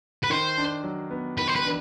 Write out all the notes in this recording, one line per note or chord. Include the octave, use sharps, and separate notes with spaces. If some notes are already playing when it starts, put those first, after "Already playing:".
B4
D#3 C5
D4
F#3
B3
D#3 B4
C5
B4
D4